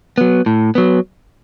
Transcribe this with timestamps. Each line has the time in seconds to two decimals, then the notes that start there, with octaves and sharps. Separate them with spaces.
0.18 F#3 B3
0.46 A2
0.75 F#3 B3